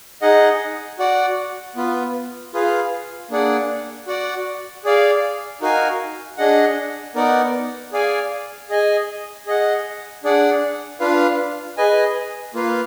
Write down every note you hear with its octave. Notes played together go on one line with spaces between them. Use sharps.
D#4 G#4 D#5 F#5
F#4 D5 F#5
B3 F4 B4
F4 G#4 B4 F5
A#3 D4 G#4 D5 F#5
F#4 D5 F#5
G#4 D5 F5
D#4 F#4 A#4 F5 G#5
D4 G#4 D#5 F#5
B3 D#4 A#4 D5 F#5
G#4 D5 F5 G#5
G#4 D#5 G#5
G#4 D#5 F#5
D4 G#4 D5 F#5
D4 F4 B4 F5
G#4 B4 D#5 G#5
A#3 F4 B4 F5